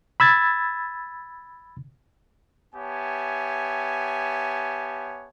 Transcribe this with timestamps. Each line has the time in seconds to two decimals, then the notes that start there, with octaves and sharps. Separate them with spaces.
0.20 B5 E6 G#6 A6
2.75 B3 G4 C#5 E5 G#5 A5